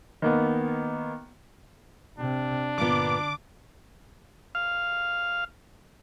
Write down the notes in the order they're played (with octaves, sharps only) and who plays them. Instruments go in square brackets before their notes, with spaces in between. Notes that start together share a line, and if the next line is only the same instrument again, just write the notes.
[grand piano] D#3 A#3 B3
[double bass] C3 [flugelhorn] D4
[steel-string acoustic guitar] G2 A#2 B3 [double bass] D3 [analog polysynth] D6
[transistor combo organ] F5